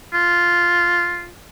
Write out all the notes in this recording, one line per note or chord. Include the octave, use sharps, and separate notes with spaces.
F4